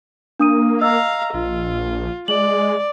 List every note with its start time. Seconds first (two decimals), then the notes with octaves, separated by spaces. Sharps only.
0.39 A#3 D4 D#6 D#7
0.81 D#5 F5 A#5 E6
1.34 A#1 F4
2.28 G#3 D5 F#7